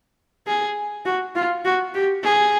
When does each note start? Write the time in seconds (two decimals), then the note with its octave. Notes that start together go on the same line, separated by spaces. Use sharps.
0.47 G#4
1.06 F#4
1.36 F4
1.65 F#4
1.94 G4
2.24 G#4